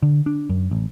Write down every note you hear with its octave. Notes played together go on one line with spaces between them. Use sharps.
D3
D4
F#2
A1